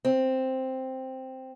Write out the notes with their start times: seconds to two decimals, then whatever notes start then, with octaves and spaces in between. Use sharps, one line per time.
0.05 C4